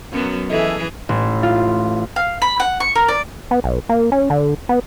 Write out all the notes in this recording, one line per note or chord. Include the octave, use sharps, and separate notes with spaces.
F#2 F#3 B3
E3 G#4 A4 D#5 E5
A1
F4
F5
B5
F#5
C#6
A#4
D5
B3
B1
A#3
C#4
D3
B3